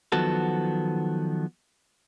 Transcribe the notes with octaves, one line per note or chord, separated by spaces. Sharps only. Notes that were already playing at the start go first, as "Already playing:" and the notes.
D#3 F3 F#3 B3 F#4 A4